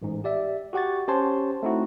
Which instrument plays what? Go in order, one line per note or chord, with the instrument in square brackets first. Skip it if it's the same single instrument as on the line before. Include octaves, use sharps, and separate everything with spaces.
[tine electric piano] A1 G#2
G4 D5 E5
F#4 G4 F#5 C#6 A6
C#4 G4 C5 C#5 A5 C6
A3 C4 D#4 E4 F#4